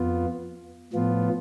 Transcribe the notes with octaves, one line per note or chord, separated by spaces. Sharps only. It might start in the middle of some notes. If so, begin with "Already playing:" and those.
Already playing: F2 B3 F4
A2 F3 B3 F4